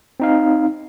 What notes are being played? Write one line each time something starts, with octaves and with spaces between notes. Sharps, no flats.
C4 D#4 F5